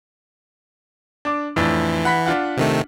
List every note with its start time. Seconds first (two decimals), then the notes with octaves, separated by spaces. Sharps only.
1.25 D4 D6
1.56 F2 A2 E3 D4
2.05 F#5 B5 B6
2.26 D4 F4 F#5
2.57 C3 D#3 A3